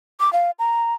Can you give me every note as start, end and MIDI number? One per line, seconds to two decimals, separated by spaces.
0.20 0.32 86
0.33 0.51 77
0.59 0.94 82